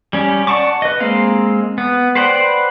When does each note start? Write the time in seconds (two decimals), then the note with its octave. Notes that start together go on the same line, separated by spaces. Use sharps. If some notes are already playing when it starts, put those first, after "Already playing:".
0.13 G3 C#4 G4
0.47 D5 F#5 A5 C#6 D6
0.82 B4 D#5
1.00 G#3 A#3 C4 F5
1.78 B3
2.15 B4 C5 D5 F#5 G5